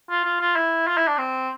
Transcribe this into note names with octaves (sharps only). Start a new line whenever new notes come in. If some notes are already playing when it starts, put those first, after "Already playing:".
F4
F4
F4
E4
F4
E4
D4
C4